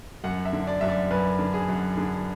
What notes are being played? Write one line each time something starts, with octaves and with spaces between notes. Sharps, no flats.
F#2 F#5
E5
D3
D5
F#2 E5
D5
F#2 B4
D3
G#4
F#2
D3 G#4